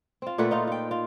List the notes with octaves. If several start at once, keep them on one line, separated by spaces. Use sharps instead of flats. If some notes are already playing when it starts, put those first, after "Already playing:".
C4 F4
A#2 A3 B4 F#5
D#4 F4
F4 G5
F4